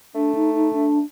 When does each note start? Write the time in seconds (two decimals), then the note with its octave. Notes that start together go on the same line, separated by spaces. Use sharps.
0.15 A3 D4
0.35 D#4
0.54 D#4
0.73 D4